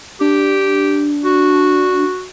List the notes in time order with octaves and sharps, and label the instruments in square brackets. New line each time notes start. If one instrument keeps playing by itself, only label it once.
[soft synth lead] D4 [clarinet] G4
[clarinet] F#4